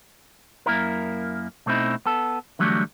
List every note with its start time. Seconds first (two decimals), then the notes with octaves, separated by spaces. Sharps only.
0.66 F#2 A#3 E4 A#4
1.66 B2 A3 C4 D#4 E4
2.06 B3 A4
2.59 D3 E3 F#3 G3 A3